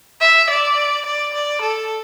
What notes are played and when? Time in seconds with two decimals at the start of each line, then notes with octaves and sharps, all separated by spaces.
0.21 E5
0.50 D5
1.05 D5
1.34 D5
1.61 A4